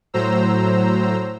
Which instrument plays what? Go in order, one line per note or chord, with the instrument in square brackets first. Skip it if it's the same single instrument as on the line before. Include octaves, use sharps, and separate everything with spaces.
[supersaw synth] A2 F#3 C5 A#5 E6